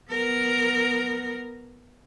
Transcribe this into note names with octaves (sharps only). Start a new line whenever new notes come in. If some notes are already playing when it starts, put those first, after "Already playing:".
B3 A#4